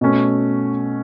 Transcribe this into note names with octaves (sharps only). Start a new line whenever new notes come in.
B2 A3 C#4